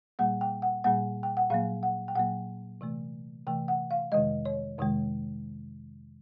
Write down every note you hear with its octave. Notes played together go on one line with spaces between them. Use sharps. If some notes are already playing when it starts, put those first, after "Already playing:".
A#2 G3 A#3 F#5
G5
F#5
A#2 G3 A#3 F#5
G5
F#5
A#2 F#3 A#3 F5
F#5
G5
A#2 F#3 A#3 F#5
C3 E3 A3
C3 E3 A3 G5
F#5
F5
F2 C3 D#3 G#3 D#5
C#5
F2 C3 D#3 G#3